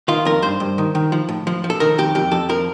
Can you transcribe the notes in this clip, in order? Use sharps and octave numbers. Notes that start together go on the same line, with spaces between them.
D#3 F4
F2 A#4
G2 C5
G2
D#3
D#3
F3
A2
F3
F3
A4
D#3 A#4
F2 G4
F2 G4
F2 A4
F3 A#4